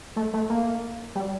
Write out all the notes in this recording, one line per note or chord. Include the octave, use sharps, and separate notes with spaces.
A3
A3
A#3
G3